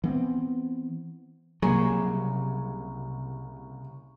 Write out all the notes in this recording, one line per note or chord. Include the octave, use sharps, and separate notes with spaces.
E3 B3 C4
C2 C#3 F#3 A#3 G#4 A#5 C#6